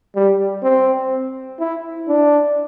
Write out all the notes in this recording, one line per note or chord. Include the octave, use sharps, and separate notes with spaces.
G3
C4
E4
D4